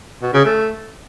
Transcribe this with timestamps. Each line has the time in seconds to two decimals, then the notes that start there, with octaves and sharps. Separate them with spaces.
0.22 B2
0.34 C#3
0.45 A3